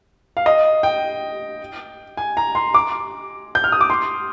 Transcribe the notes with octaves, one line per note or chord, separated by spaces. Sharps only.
F5
D#5
G5
G#5
A#5
C6
D6
G6
F6
D#6
D6
C6